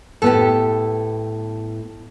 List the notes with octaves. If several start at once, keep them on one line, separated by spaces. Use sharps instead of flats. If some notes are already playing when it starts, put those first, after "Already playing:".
A2 B3 G4 A4